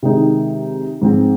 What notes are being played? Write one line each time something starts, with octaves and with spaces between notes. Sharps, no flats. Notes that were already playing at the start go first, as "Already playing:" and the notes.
C3 D#3 G#3 D#4
G#2 F3 G#3 C4